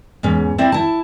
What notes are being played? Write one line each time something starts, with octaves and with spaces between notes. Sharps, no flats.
E2 G#2 C#4
C4 E4 C5 D5 E5
E4 A5